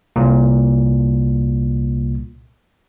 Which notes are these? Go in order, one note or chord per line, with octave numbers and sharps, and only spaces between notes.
C2 A#2